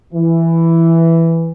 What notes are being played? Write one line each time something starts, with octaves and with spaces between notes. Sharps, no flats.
E3